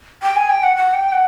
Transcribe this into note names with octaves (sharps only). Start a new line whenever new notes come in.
G5
G#5
G5
F#5
F#5
G5
F#5